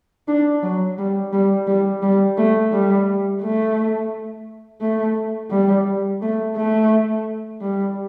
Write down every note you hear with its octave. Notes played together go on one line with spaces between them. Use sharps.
D4
F#3
G3
G3
G3
G3
A3
G3
A3
A3
G3
A3
A3
G3